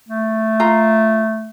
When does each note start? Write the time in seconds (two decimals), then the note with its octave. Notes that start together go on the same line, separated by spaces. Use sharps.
0.09 A3
0.60 F4 A#5